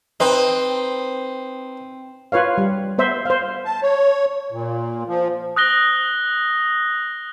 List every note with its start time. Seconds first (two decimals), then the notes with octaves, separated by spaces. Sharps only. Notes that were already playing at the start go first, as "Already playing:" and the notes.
0.20 C4 D#4 B4
2.32 F4 B4 C#5 F5
2.58 G3
2.98 B3 C5 E5
3.25 C5 F5
3.65 A5
3.83 C#5
4.52 A#2
5.08 F3
5.56 D#6 F#6 A#6 G7